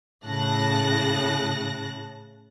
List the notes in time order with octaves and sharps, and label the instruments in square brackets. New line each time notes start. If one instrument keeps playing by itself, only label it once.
[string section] A2 C#3 A5 F#6 A#6